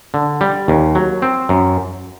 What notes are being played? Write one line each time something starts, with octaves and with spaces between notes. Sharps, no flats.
D3
G3
D#2
F#3
C4
F#2